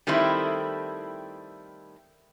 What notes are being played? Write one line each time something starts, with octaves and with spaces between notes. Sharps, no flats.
D#3 G3 A3 C4 E4